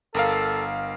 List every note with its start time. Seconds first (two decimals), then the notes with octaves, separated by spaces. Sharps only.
0.14 G1 A4 A#4 F5